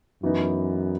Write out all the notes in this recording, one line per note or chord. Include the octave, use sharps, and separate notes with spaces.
F#2 E3 B3 D#4